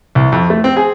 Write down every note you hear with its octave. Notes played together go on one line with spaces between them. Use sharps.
C2
F2
A3
C4
G#4